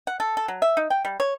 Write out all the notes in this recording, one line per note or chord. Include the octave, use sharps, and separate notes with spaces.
F#5
A4
A4
F#3
E5
D#4
G5
G3
C#5